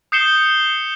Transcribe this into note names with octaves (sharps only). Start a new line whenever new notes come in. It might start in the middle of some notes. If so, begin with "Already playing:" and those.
D#6 G6 C7 C#7 E7 G7